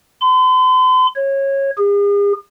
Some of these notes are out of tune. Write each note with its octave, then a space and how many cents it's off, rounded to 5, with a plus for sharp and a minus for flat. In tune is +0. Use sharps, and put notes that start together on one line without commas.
C6 -45
C#5 -20
G#4 -45